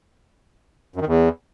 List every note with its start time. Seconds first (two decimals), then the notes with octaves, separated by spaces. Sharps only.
0.96 F#2
1.01 D#3
1.07 E2